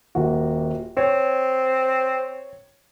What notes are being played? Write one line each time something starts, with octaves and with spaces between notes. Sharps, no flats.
D#1 A#3 F#4
C4 C#5